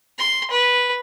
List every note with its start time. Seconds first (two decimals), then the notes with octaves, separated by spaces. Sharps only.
0.19 C6
0.51 B4